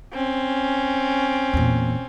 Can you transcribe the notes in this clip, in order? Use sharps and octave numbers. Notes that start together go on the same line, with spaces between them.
C4 C#4
E2 A#2